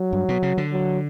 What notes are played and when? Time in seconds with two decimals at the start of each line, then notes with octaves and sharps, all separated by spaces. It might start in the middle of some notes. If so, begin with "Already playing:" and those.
Already playing: F#3
0.13 G2
0.29 B2
0.43 C#3
0.57 D3
0.72 F#3